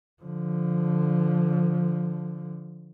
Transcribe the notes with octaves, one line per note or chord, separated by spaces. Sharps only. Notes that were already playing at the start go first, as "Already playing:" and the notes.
D3 F3